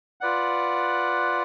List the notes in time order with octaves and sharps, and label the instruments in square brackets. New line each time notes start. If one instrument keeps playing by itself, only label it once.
[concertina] F4 B4 D5 F#5